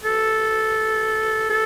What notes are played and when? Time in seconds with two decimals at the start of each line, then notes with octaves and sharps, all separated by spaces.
0.04 A4
1.50 A4